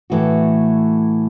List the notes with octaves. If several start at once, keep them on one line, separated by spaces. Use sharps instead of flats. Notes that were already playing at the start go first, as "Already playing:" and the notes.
A2 E3 A3 F#4